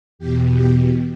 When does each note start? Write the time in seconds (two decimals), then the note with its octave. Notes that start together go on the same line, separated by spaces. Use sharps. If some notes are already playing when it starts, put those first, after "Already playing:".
0.19 E2 B2 G4
0.54 G4